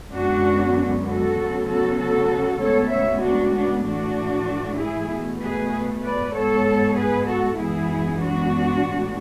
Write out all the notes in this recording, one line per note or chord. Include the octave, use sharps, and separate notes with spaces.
F#2 D3 G#3 B3 D4 F#4
F#4 A4
D2 C#3 F#3 B3
F#4 A4
F#4 A4
D2 C#3 G#3 B3 A4 C#5
C#5 E5
D4 F#4
B3 D4
A2 E3 A3 D4 F#4
E4 G#4
B2 A3
G#4 B4
B4 D5
G#2 G#3 B3 A4 C#5
G#4 B4
F#4 A4
F#2 E3 G#3 B3 E4 G#4
D4 F#4
A2 G#3 B3